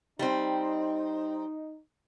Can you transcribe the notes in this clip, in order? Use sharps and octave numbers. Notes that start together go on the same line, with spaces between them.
G3 C4 D#4